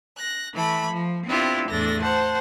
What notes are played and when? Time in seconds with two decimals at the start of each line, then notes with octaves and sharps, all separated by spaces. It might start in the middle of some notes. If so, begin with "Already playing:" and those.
0.17 F#6 A#6
0.54 E3 A3 B5
0.92 F3
1.27 B3 C4 D4 E4 F4 G4
1.69 E2 A2 D4 A4 A#6
2.02 C5 F#5 A5